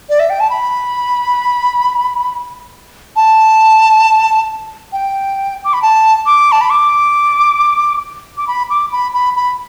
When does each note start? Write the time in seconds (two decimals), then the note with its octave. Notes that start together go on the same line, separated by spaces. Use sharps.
0.09 D5
0.20 E5
0.30 G5
0.40 A5
0.50 B5
3.16 A5
4.93 G5
5.64 D6
5.73 B5
5.82 A5
6.26 D6
6.52 A5
6.61 B5
6.71 D6
8.37 D6
8.47 B5
8.70 D6
8.92 B5
9.14 B5
9.36 B5